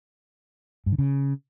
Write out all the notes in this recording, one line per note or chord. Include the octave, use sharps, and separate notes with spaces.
G2
D3
C#3